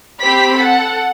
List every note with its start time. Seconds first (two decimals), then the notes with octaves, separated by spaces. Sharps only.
0.21 C4 G4 C5 G5 B5 B6
0.58 A4 F#5